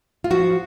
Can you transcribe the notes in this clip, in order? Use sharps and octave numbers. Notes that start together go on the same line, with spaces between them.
F4
F3 F#4